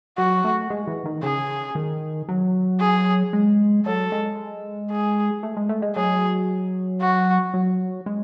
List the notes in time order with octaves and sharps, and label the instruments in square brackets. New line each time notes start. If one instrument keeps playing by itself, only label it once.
[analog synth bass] F#3 [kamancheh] F#4
[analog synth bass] A3
G#3
E3
D#3
[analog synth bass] C#3 [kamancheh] G#4
[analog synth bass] D#3
F#3
[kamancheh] G#4
[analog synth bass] G#3
[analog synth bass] F#3 [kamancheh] A4
[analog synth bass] G#3
[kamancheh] G#4
[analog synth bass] A3
G#3
A3
G#3
[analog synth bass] F#3 [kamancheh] G#4
[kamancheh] F#4
[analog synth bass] F#3
G#3